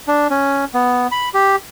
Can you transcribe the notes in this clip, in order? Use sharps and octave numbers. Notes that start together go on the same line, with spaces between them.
D4
C#4
B3
B5
G4